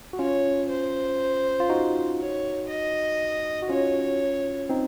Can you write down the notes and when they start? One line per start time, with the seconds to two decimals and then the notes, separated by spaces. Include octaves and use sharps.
0.13 F#4
0.19 C#4 F4 C#5
0.69 C5
1.60 F4
1.69 D#4 F#4
2.19 C#5
2.69 D#5
3.62 F#4
3.69 C#4 F4 C#5
4.69 C4 D#4